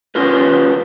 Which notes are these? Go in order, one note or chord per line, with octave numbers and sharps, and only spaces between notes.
C#4 F4 A#4 B4